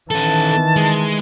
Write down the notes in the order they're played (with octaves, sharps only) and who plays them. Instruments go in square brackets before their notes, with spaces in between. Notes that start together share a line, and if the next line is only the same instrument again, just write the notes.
[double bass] D#3 E3 [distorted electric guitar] C#4 A4 [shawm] A5
[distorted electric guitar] G#3